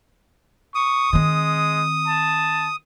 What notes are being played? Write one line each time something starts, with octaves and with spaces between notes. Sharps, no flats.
C#6 D#6
D#3 G#3 C4
A5